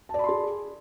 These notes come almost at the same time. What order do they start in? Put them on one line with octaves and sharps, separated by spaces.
A5 D5 B5 C6 G#4